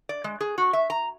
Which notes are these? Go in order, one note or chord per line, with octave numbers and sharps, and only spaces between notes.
D5
G#3
G#4
F#4
E5
A#5